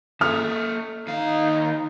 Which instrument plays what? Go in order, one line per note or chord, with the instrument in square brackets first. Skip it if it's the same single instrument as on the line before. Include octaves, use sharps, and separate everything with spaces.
[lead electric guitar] A#3 A4 [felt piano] F6
[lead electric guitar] D#2 F5 [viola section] D#4